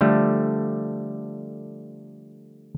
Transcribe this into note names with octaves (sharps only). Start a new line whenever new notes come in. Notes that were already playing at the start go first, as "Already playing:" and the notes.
D3 F3 G3 A3